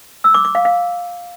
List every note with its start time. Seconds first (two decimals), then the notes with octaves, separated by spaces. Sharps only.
0.24 E6
0.34 D6
0.45 D6
0.55 F5
0.65 F5